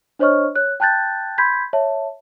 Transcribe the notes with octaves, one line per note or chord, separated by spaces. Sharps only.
D4 C5 C#5 D#5 C#6 F6
C#5 F#6
G5 A5 F#6 G6 A6
B5 C6 G6 G#6 B6
C#5 E5 A5